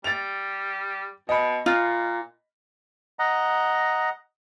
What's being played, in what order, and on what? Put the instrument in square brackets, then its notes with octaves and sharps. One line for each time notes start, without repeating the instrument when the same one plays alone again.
[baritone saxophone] G3 [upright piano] A6 F7
[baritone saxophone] B2 [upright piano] D#5 B5
[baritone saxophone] A#2 [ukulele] F4
[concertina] D#5 F#5 A#5